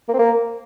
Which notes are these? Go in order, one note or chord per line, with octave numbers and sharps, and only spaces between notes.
A#3
C4
A#3